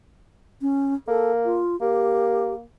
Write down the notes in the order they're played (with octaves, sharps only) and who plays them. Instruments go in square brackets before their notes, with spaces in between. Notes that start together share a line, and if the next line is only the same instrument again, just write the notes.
[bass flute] C#4
[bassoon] A#3 [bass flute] A4
[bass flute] F4
[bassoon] A#3 [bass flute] G4